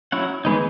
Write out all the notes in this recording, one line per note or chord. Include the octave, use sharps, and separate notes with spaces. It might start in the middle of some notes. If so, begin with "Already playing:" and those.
F#3 C#4 E4 F#5
E3 G#3 B3 D#4